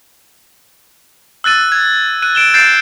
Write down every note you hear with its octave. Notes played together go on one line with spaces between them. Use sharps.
E6 F#6 A6 D#7
G#6
F#6 D#7
D7 E7 G7
G6 A6 C7 D7 E7